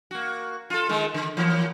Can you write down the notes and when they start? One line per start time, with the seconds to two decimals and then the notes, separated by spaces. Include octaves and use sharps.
0.11 A#3 F#4
0.70 F4 A4
0.89 D#3 G#3
1.14 D3
1.37 E3 F#3 A#3